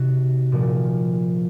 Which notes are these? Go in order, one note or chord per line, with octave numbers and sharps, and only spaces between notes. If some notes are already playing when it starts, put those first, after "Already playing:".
Already playing: C3 D#3 F#4
A#2 F3